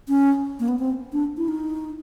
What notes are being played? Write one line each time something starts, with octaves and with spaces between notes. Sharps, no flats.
C#4
A#3
B3
C4
D4
E4
D#4